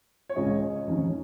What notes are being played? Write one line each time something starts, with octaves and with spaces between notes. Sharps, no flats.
C#5
C#2 C#3 G#3 C#4 D#5
F1 D#2 D#3 C#4